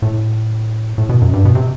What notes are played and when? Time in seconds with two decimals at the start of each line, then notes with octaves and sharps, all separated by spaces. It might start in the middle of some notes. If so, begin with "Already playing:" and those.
0.02 A2
0.98 A2
1.09 B2
1.21 F#2
1.33 G2
1.45 B2
1.55 C3